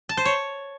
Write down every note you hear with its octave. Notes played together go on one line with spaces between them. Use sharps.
A5
C5
C#5